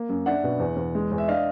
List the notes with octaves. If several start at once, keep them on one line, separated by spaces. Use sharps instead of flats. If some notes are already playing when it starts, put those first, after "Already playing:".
Already playing: A#3
F#2
D4 E5 F#5
B2
E2
E2
G#3
E2
E5
D4 D#5 F5